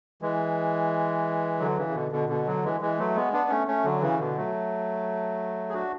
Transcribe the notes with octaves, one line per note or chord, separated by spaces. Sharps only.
E3 G#3
D3 F#3
C#3 E3
C#3
B2 D3
B2 D3
B2 D3
D3 F#3
E3 G#3
E3 G#3
F#3 A3
G#3 B3
B3 D4
A3 C#4
A3 C#4
D3 F#3
C#3 E3
B2 D3
F#3 A3
G#4
D4 F#4